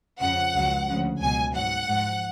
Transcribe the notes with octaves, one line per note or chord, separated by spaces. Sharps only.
F2 C#3 F3 F#5
C#2 C#3 F#3
D2 C#3 F3
C#2 B2 F#3 G#5
G#2 F#3 F#5
G#2 F3